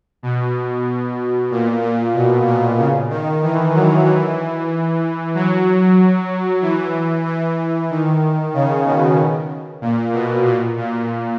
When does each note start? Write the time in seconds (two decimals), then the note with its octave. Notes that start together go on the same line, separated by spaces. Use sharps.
0.23 B2
1.51 A#2
1.82 A#2
2.14 B2
2.46 A#2
2.78 C#3
3.10 D#3
3.43 E3
3.74 F#3
4.06 E3
5.35 F#3
6.62 E3
7.26 E3
7.90 D#3
8.54 C#3
8.86 B2
9.81 A#2
10.13 B2
10.45 A#2
10.77 A#2